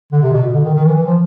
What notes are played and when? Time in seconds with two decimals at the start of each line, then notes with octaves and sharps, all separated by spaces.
0.12 D3
0.22 C3
0.33 B2
0.44 B2
0.54 D3
0.64 D#3
0.75 D#3
0.85 E3
0.95 E3
1.06 F3